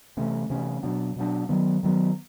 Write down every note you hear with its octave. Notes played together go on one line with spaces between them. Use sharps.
C3 E3 A3 C#4
C3 E3 A3 C#4
B2 F#3 B3 D4
B2 F#3 B3 D4
D#3 F#3 B3
D#3 F#3 B3